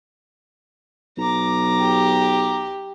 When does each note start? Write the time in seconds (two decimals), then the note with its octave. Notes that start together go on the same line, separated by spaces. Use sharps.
1.18 B1 A#5 D6
1.80 G4